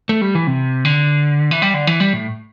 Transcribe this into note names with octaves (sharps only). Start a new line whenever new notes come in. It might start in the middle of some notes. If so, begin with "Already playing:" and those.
A3
G3
E3
C3
D3
E3
G3
D3
E3
G3
A2